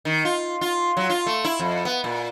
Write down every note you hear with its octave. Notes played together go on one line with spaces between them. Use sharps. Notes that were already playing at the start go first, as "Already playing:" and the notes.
D#3
F4
F4
F#3
F4
A3
E4
F2
B3
A#2